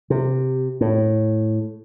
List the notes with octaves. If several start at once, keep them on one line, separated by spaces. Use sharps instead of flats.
C3
A2